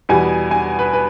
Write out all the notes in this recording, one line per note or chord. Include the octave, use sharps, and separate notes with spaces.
E2 B2 G3 G#5
G#5
B4
B4